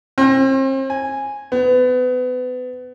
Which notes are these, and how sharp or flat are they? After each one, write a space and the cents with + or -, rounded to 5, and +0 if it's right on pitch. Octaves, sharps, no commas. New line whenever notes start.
C4 +40
G#5 -5
B3 +30